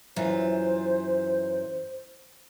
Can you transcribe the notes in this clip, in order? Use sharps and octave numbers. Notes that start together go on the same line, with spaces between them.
F#2 E3 F4 C5